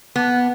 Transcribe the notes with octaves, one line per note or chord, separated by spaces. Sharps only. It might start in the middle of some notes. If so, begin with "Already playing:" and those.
B3